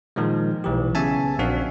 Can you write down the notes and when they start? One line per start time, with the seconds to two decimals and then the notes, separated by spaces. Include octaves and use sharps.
0.16 A#2 D#3 F3 G#3
0.64 B1 E3 G4
0.95 C#3 B3 C#4 E5 G#5 A5
1.39 A#1 C4 D4 F#4 F5